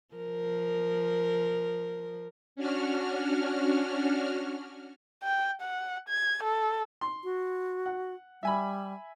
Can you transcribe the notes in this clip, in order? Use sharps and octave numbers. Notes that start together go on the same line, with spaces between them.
F3 A#4
C#4 D4 F#4 F6
G5
F#5
G#6
A4
C6
F#4
F#5
G3 E5 G#5 B5